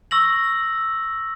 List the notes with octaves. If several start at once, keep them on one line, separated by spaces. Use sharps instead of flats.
C#6 E6 A#6 F#7